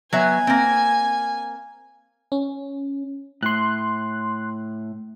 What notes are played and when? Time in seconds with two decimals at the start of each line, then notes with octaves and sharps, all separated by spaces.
0.13 F#3 B3 E5 G#5
0.47 A#3 C4
2.32 C#4
3.43 A2 C6 F#6